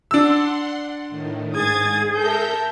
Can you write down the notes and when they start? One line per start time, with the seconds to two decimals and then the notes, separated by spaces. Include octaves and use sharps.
0.11 D4 F#5 C6 E6
1.09 A2 D#3
1.54 G#2 G#4 D#6 G#6 A6
2.16 A4 A#4 E5 A#5 G6